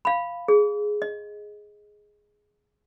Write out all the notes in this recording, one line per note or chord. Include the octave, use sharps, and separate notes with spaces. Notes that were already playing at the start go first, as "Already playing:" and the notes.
F5 B5
G#4
D#5